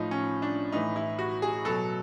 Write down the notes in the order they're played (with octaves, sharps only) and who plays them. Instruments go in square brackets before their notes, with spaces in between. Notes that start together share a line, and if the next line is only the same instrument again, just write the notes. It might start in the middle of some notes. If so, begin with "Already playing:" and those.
Already playing: [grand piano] A2 F3 D#4
C#4
D4
A2 E3 D#4
E4
F#4
G#4
B2 F#3 A4